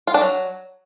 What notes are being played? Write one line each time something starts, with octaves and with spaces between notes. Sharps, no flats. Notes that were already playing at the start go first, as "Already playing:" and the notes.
F4
D4
F#3